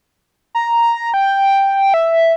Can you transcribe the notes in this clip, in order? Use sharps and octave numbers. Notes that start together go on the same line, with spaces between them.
A#5
G5
E5